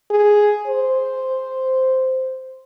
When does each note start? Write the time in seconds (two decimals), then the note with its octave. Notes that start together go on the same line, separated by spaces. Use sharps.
0.11 G#4
0.67 C5